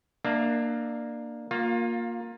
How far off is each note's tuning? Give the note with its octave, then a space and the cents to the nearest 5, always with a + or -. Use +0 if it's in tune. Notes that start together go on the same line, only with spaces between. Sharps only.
A#3 +0 D4 +25 E5 +0
A#3 +0 F4 +25